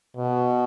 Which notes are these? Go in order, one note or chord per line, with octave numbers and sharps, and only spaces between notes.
B2